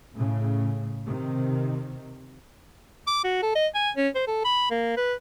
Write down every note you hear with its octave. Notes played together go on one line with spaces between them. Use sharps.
A2 C#3
C3 D#3
D6
F#4
A4
D#5
G#5
C#4
C5
A4
B5
A#3
B4